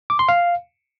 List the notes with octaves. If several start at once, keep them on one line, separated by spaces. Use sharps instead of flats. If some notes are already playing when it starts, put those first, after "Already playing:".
D6
C6
F5